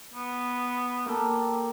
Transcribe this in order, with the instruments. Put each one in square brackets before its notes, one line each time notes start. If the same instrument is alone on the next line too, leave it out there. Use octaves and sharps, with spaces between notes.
[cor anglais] B3
[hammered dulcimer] A#3 G4 A4